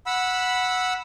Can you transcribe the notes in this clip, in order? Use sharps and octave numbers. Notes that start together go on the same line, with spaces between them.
F#5 B5 E6